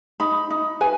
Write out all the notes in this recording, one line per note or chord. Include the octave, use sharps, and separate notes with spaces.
D#4 B5
D#4
B4 G#5